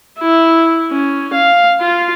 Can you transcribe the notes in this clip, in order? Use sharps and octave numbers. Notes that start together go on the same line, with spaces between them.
E4
C#4
F5
F4